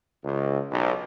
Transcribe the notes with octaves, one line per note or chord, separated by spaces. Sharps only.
C#2
B1